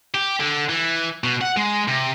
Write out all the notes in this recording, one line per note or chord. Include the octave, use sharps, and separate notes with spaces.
G4
D3
E3
B2
F#5
G#3
C3